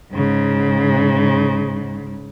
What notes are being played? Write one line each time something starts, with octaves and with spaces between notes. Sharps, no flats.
G#2 C#3